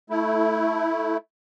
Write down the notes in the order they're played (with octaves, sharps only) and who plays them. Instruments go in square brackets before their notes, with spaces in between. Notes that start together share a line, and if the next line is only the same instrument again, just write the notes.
[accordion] A3 E4